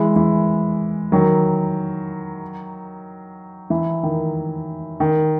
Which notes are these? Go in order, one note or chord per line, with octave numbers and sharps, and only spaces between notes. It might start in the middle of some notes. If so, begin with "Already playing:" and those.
Already playing: E3 G#3
E3
D#3 F#3
E3
D#3
D#3